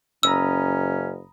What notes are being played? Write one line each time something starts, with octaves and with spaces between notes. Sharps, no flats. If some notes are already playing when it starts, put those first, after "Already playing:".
F#1 C#4 A#5 B5 D#6 E6